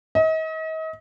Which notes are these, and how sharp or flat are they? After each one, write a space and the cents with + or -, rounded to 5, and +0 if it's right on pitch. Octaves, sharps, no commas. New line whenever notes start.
D#5 +40